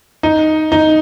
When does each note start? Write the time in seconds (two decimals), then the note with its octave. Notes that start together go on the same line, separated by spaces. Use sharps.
0.23 D#4
0.72 D#4